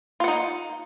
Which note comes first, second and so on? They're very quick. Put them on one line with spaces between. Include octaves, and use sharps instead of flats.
F4 F#5 D#4